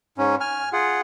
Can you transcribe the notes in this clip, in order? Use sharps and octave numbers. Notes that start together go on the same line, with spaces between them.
G#2 C#4
G#5 F6
F4 G#4 F#5